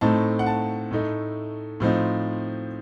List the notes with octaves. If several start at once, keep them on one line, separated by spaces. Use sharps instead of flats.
A2 A3 C4 D#4 A5
F#5
A5
A2 A3 D#4
A2 F3 C4 D#4